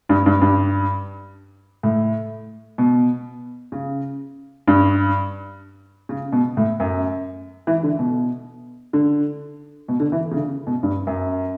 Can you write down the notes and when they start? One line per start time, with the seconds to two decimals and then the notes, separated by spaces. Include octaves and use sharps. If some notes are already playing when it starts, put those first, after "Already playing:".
0.09 G2
0.26 G2
0.42 G2
1.83 A2
2.78 B2
3.72 C#3
4.67 G2
6.09 C#3
6.32 B2
6.57 A2
6.80 F#2
7.67 E3
7.83 D3
7.99 B2
8.93 D3
9.88 B2
10.00 D3
10.12 E3
10.31 C#3
10.36 D3
10.67 B2
10.83 G2
11.07 F#2